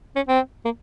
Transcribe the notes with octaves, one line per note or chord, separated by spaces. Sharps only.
C#4
C4
A#3